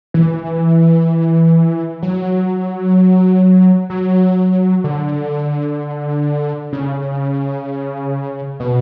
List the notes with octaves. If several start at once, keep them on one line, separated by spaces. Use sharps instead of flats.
E3
F#3
F#3
D3
C#3
B2